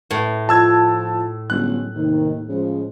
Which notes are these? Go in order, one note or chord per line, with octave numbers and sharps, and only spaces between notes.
A2
F3 F4 A5 E6 G#6
G1 F#3 G#3 C#4 F#6
D#2 C3 D#3
C#3 F3 G#3